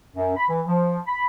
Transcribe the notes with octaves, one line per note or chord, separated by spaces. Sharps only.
F#2
B5
E3
F3
B5